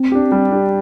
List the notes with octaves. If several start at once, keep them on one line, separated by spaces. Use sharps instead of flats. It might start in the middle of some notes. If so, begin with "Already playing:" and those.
Already playing: C4
D4 G4
G3
D4 G4